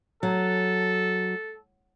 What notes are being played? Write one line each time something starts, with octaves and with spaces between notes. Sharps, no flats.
F#3 A4